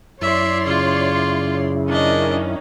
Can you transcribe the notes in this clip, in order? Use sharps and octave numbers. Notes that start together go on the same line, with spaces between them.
F#2 E4 C#5 D5 E5 C6
C#3 F4
D#3 C#4 D4 D#5